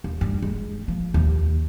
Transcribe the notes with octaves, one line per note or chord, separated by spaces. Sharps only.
D#2
G2
G#3
F3
D#2